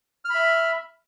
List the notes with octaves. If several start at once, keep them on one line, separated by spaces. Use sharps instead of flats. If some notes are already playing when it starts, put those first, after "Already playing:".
E5 B5 F6